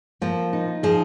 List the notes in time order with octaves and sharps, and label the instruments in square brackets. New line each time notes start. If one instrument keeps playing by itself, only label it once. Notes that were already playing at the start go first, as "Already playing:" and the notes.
[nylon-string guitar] F3 [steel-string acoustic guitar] A#3
[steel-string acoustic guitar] D#4
[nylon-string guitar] F3 [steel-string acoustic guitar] G#4